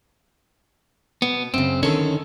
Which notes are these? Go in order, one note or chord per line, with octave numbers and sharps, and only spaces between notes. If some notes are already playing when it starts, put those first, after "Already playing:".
B2 B3
F#2 C#3 C4
D3 D#3 C#4 A4